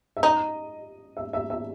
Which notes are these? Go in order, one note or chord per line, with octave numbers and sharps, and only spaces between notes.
E5
D#4 D#5
E5
E5
E5